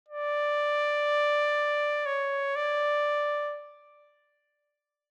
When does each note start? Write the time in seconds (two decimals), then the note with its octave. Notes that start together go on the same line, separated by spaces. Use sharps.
0.09 D5
2.06 C#5
2.56 D5